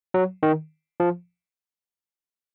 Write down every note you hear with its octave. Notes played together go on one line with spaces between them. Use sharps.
F#3
D#3
F3